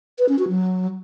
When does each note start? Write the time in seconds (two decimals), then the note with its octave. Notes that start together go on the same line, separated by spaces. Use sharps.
0.19 B4
0.29 C#4
0.39 F#4
0.49 F#3